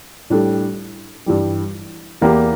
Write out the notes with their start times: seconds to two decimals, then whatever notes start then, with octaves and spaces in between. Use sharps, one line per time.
0.30 A2 G3 D4 A4
1.26 G2 E3 G3
2.21 E2 E3 A#3 E4 G4